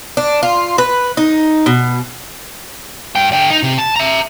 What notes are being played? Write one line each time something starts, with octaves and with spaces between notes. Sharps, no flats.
D4
F4
B4
D#4
B2
G2 G5
D3 G5
D#4
C3
A5
E5 A#5